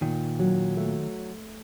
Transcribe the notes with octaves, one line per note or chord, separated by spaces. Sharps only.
A#2 D#3
F#3
A3